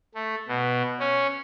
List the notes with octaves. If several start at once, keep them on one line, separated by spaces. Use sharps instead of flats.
A3
B2
C#4